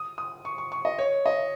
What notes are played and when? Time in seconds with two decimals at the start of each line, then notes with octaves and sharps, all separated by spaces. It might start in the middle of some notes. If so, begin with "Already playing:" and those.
Already playing: D#6
0.18 D#6
0.45 C#6
0.58 C#6
0.72 C#6
0.85 D#5
0.99 C#5
1.26 D#5